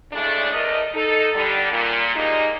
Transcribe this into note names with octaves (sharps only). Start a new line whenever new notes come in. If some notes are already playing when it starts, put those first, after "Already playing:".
A2 C#3 G#3 A3 D4
E2 A3 A#4 D#5
D#4 A4
D3 G3
A#2
G3 G#3 A#3 D#4